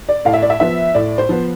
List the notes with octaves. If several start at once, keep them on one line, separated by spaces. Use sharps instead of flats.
D5
A2 F5
E5
D5
E5
F3 B3 E5
A2 D5
C5
F3 B3